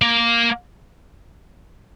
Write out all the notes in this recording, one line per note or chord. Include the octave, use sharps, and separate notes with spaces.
A#3